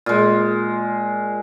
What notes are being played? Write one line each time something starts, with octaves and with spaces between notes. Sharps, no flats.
A#2 G#3